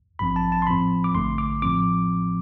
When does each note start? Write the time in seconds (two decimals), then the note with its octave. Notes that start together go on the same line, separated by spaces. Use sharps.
0.19 A1 G2 F3 C4 B5
0.36 A5
0.52 A5
0.62 C6
0.67 A2 F3 C4 B5
1.04 D6
1.15 A1 G2 D3 A3 C6
1.38 D6
1.62 A2 F3 C4 D6